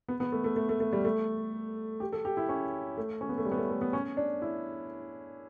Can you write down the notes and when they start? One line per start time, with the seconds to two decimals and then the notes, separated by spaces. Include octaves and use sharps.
0.08 B3
0.20 B3
0.32 A3
0.44 A3
0.56 A3
0.69 A3
0.80 A3
0.93 G3
1.05 A3
2.00 G4
2.12 A4
2.25 G4
2.37 E4
2.49 C#4
2.97 A3
3.21 C#4
3.29 B3
3.38 A3
3.45 G3
3.52 B3
3.57 A3
3.70 A3
3.81 B3
3.93 C#4
4.17 D4
4.42 E4